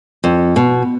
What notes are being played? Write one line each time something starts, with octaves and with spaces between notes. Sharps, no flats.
F2
B2